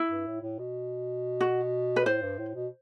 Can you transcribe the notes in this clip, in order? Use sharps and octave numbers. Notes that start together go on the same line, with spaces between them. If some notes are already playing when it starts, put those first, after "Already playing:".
Already playing: E4
G2
A2
A2
B2
F#4
B4
A2 C5
G2
A2
B2